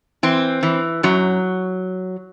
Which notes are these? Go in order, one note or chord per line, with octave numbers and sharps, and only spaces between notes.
E3 C4
E3
F#2 F#3